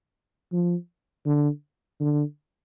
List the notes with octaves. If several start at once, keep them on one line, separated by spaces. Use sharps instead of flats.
F3
D3
D3